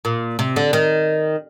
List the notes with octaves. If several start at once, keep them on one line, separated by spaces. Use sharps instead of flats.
A#2
C3
D3
D#3